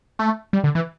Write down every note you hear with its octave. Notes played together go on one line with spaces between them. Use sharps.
A3
G3
D3
E3